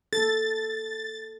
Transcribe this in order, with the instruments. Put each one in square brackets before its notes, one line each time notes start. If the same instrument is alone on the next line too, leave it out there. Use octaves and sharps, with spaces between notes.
[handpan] A#3 A4 [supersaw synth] A6